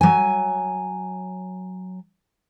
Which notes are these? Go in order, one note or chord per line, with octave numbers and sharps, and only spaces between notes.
F#3 G#5